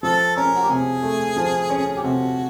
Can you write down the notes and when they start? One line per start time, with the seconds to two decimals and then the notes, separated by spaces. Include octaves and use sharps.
0.03 F3 A4
0.36 C#4 A#4
0.55 F#4
0.62 G4
0.69 C3 G#4
1.03 A3
1.37 F3
1.70 C#4
1.97 G4
2.03 C3 F#4